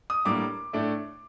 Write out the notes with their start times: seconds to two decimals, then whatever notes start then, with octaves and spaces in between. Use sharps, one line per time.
0.10 D#6
0.25 A2 G3 A#3 D4 D6
0.73 A2 A3 D4